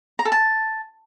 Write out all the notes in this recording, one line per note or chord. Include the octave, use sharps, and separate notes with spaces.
A#5
A4
A5